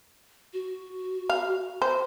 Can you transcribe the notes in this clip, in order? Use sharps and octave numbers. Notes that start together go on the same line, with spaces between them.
F#4
F5
C5